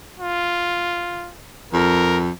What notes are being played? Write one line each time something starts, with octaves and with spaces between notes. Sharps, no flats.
F4
F2 A#4